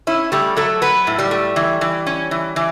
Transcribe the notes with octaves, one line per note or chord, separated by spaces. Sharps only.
C#4 E4
G3 A3 G4
F#3 A3 A4
F#3 B3 B4
A2
G3 G4
A3
E3
E3
C#4
E3
E3